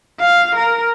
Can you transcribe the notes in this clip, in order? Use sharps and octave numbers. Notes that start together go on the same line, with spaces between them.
F5
A#4